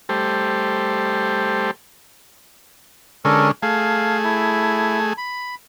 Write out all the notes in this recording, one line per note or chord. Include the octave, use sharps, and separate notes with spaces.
G3 A3 G4 A4 C5
D3 G#3 C#4 A4 A#4
A3 G#4 F5
E4
B5